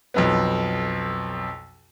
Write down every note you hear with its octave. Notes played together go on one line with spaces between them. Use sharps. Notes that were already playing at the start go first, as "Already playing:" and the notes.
B1 F2 B3